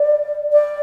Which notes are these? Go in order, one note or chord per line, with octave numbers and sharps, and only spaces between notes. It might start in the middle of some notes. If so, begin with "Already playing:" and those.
Already playing: D5
D5